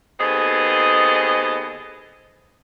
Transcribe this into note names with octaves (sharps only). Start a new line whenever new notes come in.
D#2 B3 C4 G#4 A4 D#5